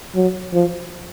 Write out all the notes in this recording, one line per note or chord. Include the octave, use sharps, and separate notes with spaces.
F#3
F3